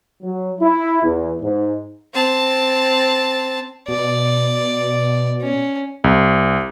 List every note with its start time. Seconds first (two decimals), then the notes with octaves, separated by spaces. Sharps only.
0.22 F#3
0.61 E4
1.03 E2
1.42 G#2
2.13 C4 A5
3.88 B2 D5
5.41 C#4
6.04 C2